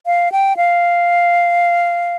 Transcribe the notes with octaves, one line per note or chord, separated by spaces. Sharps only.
F5
G5
F5